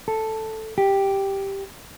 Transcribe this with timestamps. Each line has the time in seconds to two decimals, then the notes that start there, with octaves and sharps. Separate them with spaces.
0.08 A4
0.78 G4